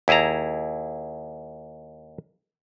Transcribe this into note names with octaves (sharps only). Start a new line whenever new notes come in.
D#2 E4 G#4 A5 A#5